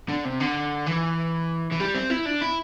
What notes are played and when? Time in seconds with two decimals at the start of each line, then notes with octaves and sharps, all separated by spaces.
0.09 D3
0.25 C3
0.41 D3
0.87 E3
1.71 E3
1.80 G3
1.94 C4
2.10 E4
2.25 D4
2.41 E4